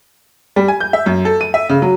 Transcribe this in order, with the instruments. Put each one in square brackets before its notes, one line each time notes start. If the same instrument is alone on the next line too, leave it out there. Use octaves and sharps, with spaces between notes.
[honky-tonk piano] G3
G#5
G6
E5
F#2
A4
D#7
E5
C#3
F#3